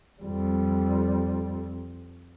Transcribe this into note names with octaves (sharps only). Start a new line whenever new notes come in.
F2 G3